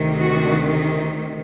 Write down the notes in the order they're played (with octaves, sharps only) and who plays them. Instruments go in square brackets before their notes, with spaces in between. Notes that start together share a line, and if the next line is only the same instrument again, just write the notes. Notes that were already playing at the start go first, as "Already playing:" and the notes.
Already playing: [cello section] D2 C3 D#3
F#4